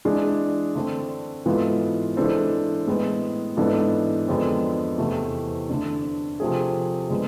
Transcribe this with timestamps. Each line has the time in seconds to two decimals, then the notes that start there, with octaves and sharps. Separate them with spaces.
0.05 E3 G#3 D4 G#4
0.75 D3 A3 C4
1.46 G#2 E3 B3 F4 A4
2.17 E3 G#3 D4 A4 C5
2.87 A2 G#3 B3
3.57 G#2 E3 B3 D4 A4
4.28 F2 D3 G#3 B3
4.98 E2 C3 E3 A3
5.69 D3 A3 D4
6.40 C3 F3 A3 C4 G#4
7.10 D3 G#3 B3